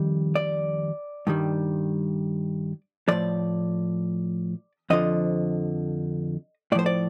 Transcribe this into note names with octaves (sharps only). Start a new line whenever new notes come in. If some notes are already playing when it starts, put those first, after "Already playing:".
Already playing: F2 D#3 G3
D5
G2 D#3 G3
A2 F3 D5
F2 D3 F3 D#5
A2 F3 C5 D5
D5